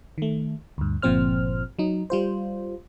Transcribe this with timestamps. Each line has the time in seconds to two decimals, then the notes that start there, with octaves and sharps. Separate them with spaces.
0.18 D#3 A3
0.78 D2 G2
1.02 G1 A#2 F3 C4 C5 F6
1.79 F#3 D#4
2.10 G3 F4 C5